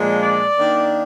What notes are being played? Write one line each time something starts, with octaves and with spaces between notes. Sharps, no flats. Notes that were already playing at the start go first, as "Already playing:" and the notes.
Already playing: A#2 F3 G#3 D4
D5
D#3 A#3 D4